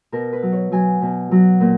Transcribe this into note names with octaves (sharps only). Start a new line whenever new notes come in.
B2 A#4
B4
F#3
C#5
F#3 G#5
B2
F#3
A#2